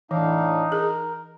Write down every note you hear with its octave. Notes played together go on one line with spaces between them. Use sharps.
A2 E3 D4 D#4 F5
G#4 A#4